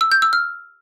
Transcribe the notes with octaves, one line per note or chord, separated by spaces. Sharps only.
E6
G6
E6
F6